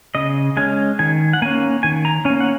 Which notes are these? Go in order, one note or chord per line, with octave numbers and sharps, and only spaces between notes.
C#3 D#5
G#3 C#4 G#5
D#3 G#5
F#5
A#3 C#4 G#5
D#3 G#5
A#5
C#4 G#5
A#3
F#5